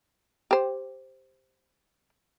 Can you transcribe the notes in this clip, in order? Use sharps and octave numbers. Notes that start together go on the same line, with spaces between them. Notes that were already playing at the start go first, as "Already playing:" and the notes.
G4 C5